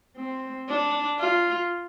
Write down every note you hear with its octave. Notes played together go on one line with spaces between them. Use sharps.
C4
D4
F4